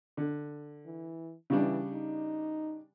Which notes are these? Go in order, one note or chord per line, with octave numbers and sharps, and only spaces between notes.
D3
E3
C#3 E3 G3 D4
D#4